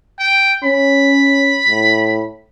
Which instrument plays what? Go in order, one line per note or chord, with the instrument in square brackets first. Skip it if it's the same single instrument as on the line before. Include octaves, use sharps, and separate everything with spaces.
[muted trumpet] G5
[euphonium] C#4 [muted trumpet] B5
[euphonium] A2